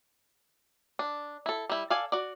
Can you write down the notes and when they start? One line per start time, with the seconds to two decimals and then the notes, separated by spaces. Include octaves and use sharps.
0.99 D4
1.46 E4 A4
1.69 G3 E4
1.90 A4 D5 F5 G#5
2.12 F#4 D5